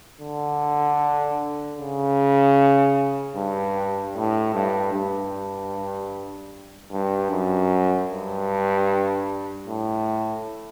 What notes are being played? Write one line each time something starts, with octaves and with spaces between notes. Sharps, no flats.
D3
C#3
G2
A2
G2
G2
G2
F#2
G2
A2